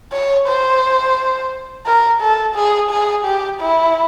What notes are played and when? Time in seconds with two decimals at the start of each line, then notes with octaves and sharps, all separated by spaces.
0.12 C#5
0.47 C5
1.86 A#4
2.21 A4
2.55 G#4
2.90 G#4
3.25 G4
3.60 E4